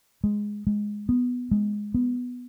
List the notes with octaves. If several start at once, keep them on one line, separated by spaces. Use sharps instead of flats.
G#3
G#3
B3
G#3
B3